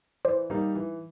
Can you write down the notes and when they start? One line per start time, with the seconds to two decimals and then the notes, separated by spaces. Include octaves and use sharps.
0.25 E3 C5 D5
0.50 G3 A#3 D#4
0.75 E3